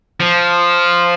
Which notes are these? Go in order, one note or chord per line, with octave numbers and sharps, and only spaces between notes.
F3